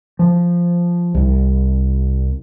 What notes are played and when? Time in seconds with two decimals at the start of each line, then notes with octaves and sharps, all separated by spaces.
0.19 F3
1.15 C2